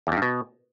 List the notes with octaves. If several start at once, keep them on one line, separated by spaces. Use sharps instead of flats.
E2
F2
G2
B2